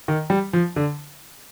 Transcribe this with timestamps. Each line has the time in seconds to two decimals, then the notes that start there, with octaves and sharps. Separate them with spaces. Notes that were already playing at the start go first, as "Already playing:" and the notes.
0.08 D#3
0.30 G3
0.53 F3
0.76 D3